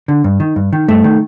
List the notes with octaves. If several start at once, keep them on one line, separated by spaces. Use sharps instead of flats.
D3
G2
D#3
G2
D#3
G2 A3
D#3